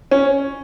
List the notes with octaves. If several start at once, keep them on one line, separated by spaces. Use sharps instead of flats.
C#4